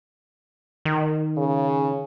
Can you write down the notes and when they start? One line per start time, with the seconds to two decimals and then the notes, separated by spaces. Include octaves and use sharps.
0.85 D#3
1.37 C#3